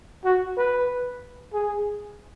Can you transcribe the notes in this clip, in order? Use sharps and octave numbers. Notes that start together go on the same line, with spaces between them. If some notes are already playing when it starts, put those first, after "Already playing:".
F#4
B4
G#4